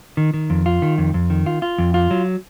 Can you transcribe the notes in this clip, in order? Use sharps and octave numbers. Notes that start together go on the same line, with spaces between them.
D#3
D#3
F2
F4
D#3
F2
F2
D#3
F4
F4
F2
F4
F#3